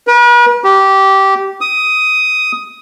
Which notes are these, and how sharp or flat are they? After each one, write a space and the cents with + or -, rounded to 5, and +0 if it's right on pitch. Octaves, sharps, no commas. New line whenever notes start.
B4 -45
G4 -15
D#6 +10